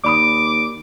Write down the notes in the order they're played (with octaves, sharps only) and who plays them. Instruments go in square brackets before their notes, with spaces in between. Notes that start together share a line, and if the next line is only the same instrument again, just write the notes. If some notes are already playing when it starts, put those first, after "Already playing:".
[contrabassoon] D#2 [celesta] D5 B5 D#6 [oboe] D6